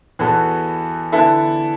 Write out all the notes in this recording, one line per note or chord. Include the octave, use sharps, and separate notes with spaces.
E2 E3 B3 F#4 A4
D3 B3 E4 A4 E5